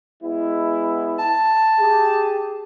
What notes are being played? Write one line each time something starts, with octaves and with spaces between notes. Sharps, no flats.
G#3 B3 E4
A5
G4 G#4